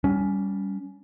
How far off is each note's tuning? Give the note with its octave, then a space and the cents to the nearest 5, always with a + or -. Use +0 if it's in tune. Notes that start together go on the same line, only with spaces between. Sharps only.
G3 +0 C#4 +20